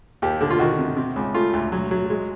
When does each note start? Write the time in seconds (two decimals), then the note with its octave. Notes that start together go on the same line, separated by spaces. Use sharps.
0.22 D#2 G4
0.41 D3
0.50 F4
0.59 D#3 F#4
0.79 C3
0.97 C3
1.16 C#2
1.34 A3 F4
1.53 D2
1.72 F#3
1.91 F#3
2.10 G#3